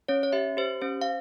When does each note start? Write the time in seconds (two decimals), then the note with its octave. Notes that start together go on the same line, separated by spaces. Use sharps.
0.08 C#4 C#5
0.23 C#5
0.32 G4 E5
0.57 G4 C5
0.81 C#4 C5
1.01 F5